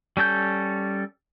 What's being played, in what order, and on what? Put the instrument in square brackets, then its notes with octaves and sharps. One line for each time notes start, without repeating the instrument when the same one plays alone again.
[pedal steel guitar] G3 C#4 A4 G6